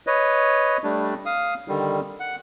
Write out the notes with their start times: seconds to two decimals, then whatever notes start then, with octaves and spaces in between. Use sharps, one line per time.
0.07 B4 C#5 D#5
0.84 G3 A3 D4
1.26 F5 D#6
1.68 D3 D#3 G3
2.20 F#5